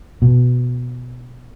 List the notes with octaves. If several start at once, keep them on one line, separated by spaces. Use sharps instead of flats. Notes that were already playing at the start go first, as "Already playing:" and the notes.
B2